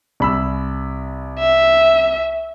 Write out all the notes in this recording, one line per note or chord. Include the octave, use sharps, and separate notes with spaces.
C2 B5 E6
E5